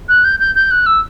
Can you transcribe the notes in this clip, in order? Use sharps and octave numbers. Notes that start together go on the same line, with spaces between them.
F#6
G6
G6
G6
F#6
E6